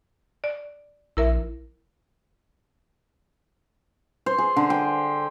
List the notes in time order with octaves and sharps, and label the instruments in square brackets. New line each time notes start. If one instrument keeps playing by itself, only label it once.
[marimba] D5
[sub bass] A#1 [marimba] E4 A#4 E5
[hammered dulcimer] C5
G#4
D3
G5